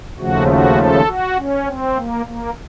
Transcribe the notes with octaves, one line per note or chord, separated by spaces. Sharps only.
D#2 C#3 F3 A3 F#4
F#4
A4
F#4
C#4
C4
A#3
A#3